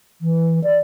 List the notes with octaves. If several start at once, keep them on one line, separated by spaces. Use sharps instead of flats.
E3
D5